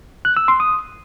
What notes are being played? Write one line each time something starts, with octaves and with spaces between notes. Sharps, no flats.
F#6
E6
C6
D#6